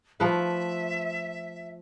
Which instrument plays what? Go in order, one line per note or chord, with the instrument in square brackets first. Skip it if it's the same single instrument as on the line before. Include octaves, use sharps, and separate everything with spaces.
[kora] F3 A3 B4 [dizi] E5